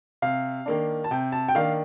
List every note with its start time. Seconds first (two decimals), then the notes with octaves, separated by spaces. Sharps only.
0.22 C3 F5
0.66 D#3 A#3 D4
1.04 A5
1.11 C3 G5
1.32 A5
1.48 G5
1.55 D#3 A#3 D4 F5